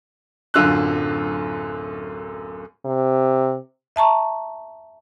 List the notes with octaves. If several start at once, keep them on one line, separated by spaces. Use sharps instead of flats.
D1 F#2 D3 F4 E6 F#6
C3
E5 A5 A#5 C#6